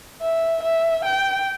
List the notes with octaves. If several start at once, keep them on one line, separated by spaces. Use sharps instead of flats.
E5
E5
G5